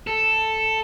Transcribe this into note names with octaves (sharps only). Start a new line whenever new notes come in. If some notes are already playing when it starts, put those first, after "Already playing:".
A4